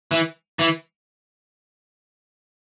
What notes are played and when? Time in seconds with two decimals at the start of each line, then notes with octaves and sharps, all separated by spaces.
0.11 E3
0.59 E3